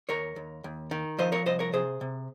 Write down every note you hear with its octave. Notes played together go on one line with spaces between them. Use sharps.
D#2 A#4 C#5
D#2
D#2
D#3
F3 C5 D#5
A#4 C#5
C2 C5 D#5
A#4 C#5
C3 G#4 C5
C3